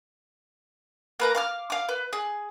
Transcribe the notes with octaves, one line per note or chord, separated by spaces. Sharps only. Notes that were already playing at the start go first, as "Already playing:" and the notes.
A#3 B4 A#5
F5 D6 F6
F5 D6
B4
G#4